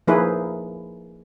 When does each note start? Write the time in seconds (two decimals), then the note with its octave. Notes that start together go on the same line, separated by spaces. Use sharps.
0.07 F3 A#3 D#4 E4 G#4 B4